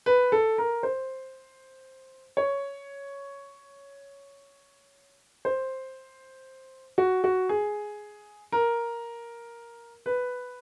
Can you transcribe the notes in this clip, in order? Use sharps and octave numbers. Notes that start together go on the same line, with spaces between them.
B4
A4
A#4
C5
C#5
C5
F#4
F#4
G#4
A#4
B4